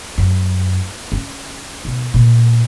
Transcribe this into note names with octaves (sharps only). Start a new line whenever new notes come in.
F#2
C#4
B1
A#2